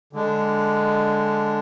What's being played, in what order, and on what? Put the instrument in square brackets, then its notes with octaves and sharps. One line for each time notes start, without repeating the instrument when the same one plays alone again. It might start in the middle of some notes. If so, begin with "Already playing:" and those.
[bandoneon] D3 G#3 D4